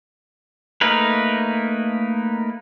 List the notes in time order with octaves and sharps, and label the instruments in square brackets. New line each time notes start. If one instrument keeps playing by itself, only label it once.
[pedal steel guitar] A3 A#3 D#4 A#4 B4